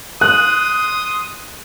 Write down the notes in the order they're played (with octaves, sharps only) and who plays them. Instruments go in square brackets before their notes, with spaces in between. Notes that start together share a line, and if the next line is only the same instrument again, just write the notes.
[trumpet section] C6 D#6 [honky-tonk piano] F#6